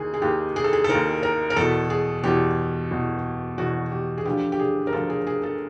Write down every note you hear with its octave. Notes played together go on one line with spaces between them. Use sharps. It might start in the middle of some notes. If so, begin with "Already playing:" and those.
Already playing: D#2 D#3 G#4
G#4
D#2 D#3 G4
G#4
A4
G#4
A4
D#2 D#3 A#4
A#4
A#4
E2 B2 A4
G#4
E2 B2 G4
E2 B2
E2 B2 F#4
G4
G#4
D2 D3 F3 G4
G4
G#4
A#4
D2 D3 F3 A4
G#4
G#4
A4